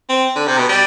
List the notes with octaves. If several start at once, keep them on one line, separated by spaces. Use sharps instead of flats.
C4
D3
C3
B2
G3